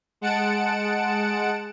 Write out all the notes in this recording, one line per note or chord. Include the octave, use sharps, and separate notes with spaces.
G#3 F#5 A5 C#7 D7 E7